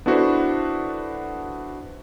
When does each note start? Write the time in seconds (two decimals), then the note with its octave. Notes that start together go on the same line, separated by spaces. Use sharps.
0.06 B3 D4 E4 F#4 A4 C5